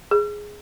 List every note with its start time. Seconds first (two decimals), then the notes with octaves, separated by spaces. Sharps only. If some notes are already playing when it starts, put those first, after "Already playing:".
0.11 G#4